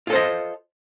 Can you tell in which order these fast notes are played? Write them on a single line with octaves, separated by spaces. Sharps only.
F4 A4 C5 D#5